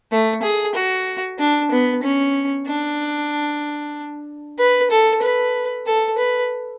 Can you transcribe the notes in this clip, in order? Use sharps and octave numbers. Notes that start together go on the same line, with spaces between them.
A3
G#4
F#4
D4
B3
C#4
D4
B4
A4
B4
A4
B4